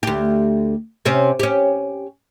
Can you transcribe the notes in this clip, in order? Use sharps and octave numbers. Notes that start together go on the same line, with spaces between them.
D2 G4
C3 C4 C#4
C#4 G4